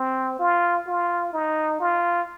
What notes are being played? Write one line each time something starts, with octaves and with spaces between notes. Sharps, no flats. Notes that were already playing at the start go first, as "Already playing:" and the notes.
Already playing: C4
F4
F4
D#4
F4